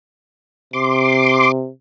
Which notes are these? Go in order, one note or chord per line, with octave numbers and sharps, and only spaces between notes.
C3 C6 D6